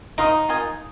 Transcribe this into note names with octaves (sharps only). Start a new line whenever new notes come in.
D#4 C5 F5 C6 D#6
F4 A#4 D#5 G#5